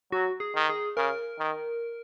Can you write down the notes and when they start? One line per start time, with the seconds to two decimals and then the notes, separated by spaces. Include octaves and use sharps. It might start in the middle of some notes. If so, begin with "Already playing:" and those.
0.12 F#3 F#4
0.40 G#4
0.55 D#3
0.69 G#4
0.97 C#3 A#4
1.39 D#3